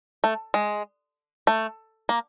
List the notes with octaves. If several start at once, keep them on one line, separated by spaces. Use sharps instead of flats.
A3
G#3
A3
A#3